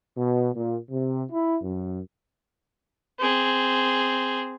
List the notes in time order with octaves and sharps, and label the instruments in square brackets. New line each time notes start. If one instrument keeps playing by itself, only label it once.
[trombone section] B2
A#2
C3
E4
F#2
[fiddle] C4 G#4